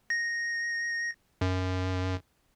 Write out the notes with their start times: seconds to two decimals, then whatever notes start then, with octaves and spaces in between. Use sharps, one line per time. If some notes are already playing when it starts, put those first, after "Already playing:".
0.10 A#6
1.41 F#2